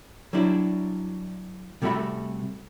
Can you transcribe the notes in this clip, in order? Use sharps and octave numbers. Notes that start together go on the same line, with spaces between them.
F#3 G3 D4 E4
C3 G3 A3 F#4 E5 B5